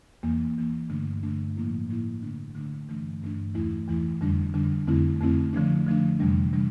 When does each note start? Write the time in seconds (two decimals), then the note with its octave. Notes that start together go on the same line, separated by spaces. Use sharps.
0.23 E2 E3 A#3
0.57 E2 E3 A#3
0.89 G2 D3 A3 D4
1.23 G2 D3 A3 D4
1.56 A2 F3 A#3 E4
1.89 A2 F3 A#3 E4
2.22 D3 A3 D4
2.55 D3 A3 D4
2.89 G2 E3 A3 D4
3.22 G2 E3 A3 D4
3.54 E2 E3 A3 E4
3.88 E2 E3 A3 E4
4.21 F2 D3 G3 D4
4.54 F2 D3 G3 D4
4.87 F2 D3 A3 C4 E4
5.20 F2 D3 A3 C4 E4
5.53 D3 F3 A3 D4
5.87 D3 F3 A3 D4
6.20 F2 C3 E3 G3 D4
6.53 C3 E3 G3 D4